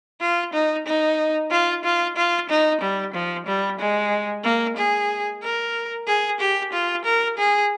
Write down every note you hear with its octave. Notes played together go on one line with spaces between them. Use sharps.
F4
D#4
D#4
F4
F4
F4
D#4
G3
F3
G3
G#3
A#3
G#4
A#4
G#4
G4
F4
A#4
G#4